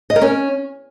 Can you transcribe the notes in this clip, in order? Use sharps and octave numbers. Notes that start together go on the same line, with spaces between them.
D#5
A#4
C#4